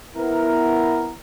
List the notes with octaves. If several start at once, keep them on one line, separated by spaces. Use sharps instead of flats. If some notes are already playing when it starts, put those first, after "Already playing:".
B3 E4 A#4